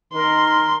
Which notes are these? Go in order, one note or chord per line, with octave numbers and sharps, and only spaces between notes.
D#3 A#4 C6